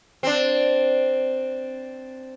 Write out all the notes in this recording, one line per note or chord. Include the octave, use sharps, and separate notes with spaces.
C4 D4